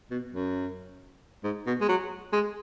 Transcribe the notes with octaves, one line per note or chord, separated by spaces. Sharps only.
B2
F#2
G#2
B2
G#3
F#3
G#3